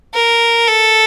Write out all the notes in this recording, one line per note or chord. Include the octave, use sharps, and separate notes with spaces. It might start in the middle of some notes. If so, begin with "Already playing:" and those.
A#4
A4